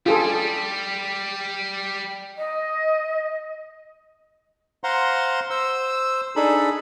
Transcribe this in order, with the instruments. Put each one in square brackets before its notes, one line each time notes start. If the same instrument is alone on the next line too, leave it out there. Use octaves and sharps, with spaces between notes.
[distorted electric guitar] G3 [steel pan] F4 G#4 A4
[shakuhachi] D#5
[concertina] C5 F5 F#5 A#5 C6
C5 E6
D4 D#4 G#4 A4 B5